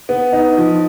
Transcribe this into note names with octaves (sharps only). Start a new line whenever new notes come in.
B3
D#4
F3